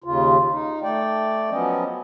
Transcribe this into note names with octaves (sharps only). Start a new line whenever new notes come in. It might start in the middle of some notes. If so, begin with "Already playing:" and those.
D#2 C#3 F4
D#4
A3 D5 G5
F3 F#3 B3 C#4 D#5